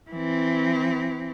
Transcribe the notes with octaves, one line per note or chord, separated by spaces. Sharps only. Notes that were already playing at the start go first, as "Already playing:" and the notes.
E3 C4